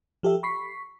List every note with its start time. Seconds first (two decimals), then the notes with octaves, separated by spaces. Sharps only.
0.23 F3 G4 A4 E5
0.43 B5 C#6 B6 C7